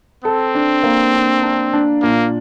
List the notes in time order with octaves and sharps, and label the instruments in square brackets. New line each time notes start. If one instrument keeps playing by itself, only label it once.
[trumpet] C4 [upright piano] A4
[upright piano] D4
A#3
D4
D4
D4
[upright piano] A#2 [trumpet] A#3